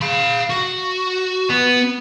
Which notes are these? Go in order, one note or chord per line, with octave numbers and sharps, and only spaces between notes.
F5 B5
F#4
B3